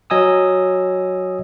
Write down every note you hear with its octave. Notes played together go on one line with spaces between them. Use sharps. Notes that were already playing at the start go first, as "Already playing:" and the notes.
F#3 D#5 G#5 D#6 E6